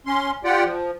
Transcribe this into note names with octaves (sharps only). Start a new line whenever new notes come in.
C#4 C6
F4 G4 D5 F#5 G5
F3